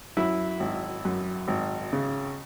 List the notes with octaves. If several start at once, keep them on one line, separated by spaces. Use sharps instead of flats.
F#2 E4
G#1
F#2
G#1
C#3